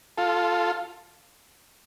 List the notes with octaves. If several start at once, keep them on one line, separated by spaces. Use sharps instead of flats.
F4 A4